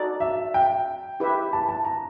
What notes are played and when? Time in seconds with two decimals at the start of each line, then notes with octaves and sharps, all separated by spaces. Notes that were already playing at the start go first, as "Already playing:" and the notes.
Already playing: D#4 F#4 A4 D5
0.20 E5
0.54 G5
1.20 E4 G4 B4 E5
1.53 A5
1.69 A5
1.85 A#5